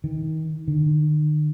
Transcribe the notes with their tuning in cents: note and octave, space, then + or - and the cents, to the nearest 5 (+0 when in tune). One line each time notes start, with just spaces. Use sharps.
D#3 +30
D#3 -45